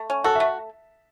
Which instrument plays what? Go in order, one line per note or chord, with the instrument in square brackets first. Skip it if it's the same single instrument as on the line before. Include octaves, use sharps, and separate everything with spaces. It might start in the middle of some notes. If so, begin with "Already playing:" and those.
Already playing: [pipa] A3
C#4
[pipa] F#4 [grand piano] A4
[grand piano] E5
[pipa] A3